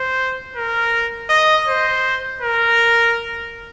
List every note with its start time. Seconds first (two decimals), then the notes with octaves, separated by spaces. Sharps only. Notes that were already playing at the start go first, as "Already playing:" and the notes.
Already playing: C5
0.56 A#4
1.30 D#5
1.67 C5
2.41 A#4